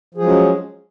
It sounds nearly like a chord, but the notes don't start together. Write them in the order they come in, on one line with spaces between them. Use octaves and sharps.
F3 G#4 F#3 G#3 C#4